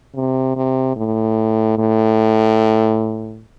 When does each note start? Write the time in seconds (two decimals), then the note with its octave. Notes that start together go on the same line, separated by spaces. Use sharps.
0.15 C3
0.56 C3
0.96 A2
1.78 A2